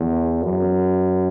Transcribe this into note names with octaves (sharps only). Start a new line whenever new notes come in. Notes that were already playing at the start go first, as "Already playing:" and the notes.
Already playing: E2
F#2